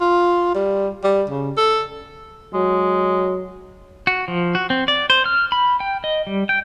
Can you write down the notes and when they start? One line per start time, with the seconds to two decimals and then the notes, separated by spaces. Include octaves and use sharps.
0.01 F4
0.55 G3
1.04 G3
1.30 C#3
1.57 A4
2.54 F#3 G#3
4.07 F#4
4.28 F3
4.55 F#4
4.70 C4
4.88 D5
5.10 C5
5.26 F6
5.52 B5
5.80 G5
6.04 D#5
6.27 G3
6.49 G5